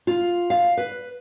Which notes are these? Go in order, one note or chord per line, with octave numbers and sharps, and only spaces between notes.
F4
F5
B4